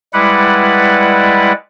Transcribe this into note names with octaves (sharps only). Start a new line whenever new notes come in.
G3 G#3 E4 B4 D5 F#5